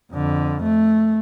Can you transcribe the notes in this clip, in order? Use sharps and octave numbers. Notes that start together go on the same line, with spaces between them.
F2 D3
A3